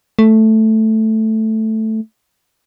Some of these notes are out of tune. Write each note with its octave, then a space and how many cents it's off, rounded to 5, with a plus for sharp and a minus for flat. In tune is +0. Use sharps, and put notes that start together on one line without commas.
A3 +0